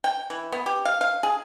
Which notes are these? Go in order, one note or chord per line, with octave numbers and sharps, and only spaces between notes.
G5
E3
B3
G4
F5
F5
G#4